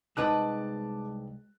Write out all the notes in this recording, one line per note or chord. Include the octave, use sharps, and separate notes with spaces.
C2 G#3 D#4 B4 A5 D6 F#6